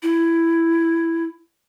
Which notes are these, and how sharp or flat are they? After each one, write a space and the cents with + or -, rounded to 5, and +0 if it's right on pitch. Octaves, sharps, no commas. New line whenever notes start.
E4 +10